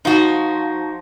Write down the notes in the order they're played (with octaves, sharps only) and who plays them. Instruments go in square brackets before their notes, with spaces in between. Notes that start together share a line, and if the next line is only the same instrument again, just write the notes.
[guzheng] F3 [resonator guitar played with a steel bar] D#4 F#4